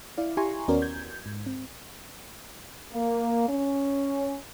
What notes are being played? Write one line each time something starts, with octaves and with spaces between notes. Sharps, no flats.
E4 D5 F5
E4 G4 G#5 A#5 C6 C#6
D#2 B3 C#4 F#4 A#4 D5
G6 G#6
G#2
C4
A#3
C#4